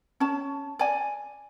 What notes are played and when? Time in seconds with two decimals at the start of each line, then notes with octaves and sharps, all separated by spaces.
0.20 C#4 A5
0.79 D5 G#5